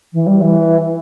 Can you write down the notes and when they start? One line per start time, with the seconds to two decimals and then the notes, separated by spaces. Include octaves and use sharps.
0.12 E3
0.26 G3
0.41 E3